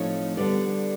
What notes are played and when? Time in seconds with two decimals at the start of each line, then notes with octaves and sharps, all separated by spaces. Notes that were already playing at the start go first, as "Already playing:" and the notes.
Already playing: A2 F3 A3 C4 D#4 C#5
0.37 D3 G3 B3 D5